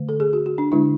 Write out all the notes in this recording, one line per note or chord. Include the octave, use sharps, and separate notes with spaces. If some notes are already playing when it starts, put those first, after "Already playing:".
Already playing: D3 A3
A4
G#4
F#4
F#4
D4
D3 G#3 D4 E4